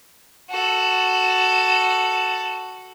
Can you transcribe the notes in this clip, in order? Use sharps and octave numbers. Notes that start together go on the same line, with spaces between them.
F#4 A4